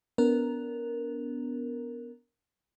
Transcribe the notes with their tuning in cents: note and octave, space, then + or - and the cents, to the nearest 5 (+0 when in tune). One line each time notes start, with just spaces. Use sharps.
B3 +0 D4 -30 A#4 +0